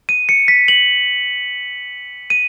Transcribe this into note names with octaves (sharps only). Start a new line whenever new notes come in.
D#7
C#7
B6
F#7
D#7